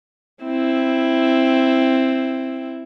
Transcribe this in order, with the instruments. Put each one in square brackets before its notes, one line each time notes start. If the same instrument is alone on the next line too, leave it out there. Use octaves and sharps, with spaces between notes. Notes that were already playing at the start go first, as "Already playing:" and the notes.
[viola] C4 E4